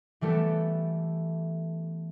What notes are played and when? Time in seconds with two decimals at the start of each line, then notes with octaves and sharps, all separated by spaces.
0.21 E3 G3 A3 B3 G4 A4